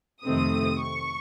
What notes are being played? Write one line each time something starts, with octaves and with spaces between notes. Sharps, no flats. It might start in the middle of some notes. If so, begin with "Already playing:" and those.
F2 C3 D#3 A3 C4 D#6
C#6